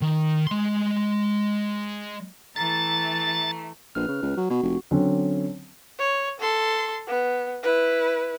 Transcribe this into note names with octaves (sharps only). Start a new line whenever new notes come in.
D#3
G#3 C6
E3 A3 A#5 A6
A#1 B4 F6
C#3
C#2
F#3
B2 F#4
F1
D3 F#3 C4 C#4
C#5
A4 C6
B3
E4 B4